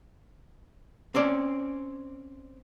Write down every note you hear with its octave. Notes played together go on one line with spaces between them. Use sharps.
C4 C#4 D5